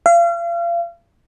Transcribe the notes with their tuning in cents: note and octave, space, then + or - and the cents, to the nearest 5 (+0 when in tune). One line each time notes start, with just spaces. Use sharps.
F5 -35